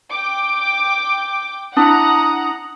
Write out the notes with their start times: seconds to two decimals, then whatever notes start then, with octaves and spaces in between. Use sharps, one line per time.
0.11 G5 D6
1.77 D4 E4 F#5 A#5 D#6